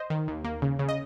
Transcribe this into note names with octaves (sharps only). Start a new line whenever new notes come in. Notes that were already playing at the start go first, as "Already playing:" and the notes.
Already playing: C5 D#5
D#3
D#2
A#3
C#3
C#3
D#5